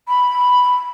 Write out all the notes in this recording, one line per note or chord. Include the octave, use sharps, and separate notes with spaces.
B5